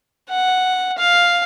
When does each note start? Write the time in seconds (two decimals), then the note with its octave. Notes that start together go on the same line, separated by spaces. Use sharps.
0.29 F#5
0.98 F5